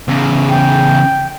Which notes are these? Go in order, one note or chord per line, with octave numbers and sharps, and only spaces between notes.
E2 C#3
G5